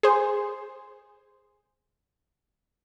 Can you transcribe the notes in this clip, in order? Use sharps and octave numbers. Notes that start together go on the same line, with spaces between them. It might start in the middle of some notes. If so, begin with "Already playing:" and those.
G#4 C5